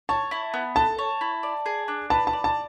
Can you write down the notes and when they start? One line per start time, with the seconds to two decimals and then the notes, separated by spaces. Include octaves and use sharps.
0.09 C#5 A5
0.31 E4
0.54 B3
0.76 A4 A5
0.99 C#5
1.21 E4
1.43 D5
1.66 G#4
1.88 D4
2.10 B4 A5
2.27 A5
2.33 D5
2.44 A5